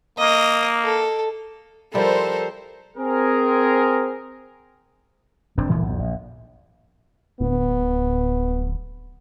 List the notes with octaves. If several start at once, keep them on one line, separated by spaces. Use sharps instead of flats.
A#3 D#5
A4
F3 G3 E4 A4 A#4 C5
C4 G#4 A#4
F1 G2 C4 D4
G1 D2 A#2 E3
B1 F2
A#1
D1 B3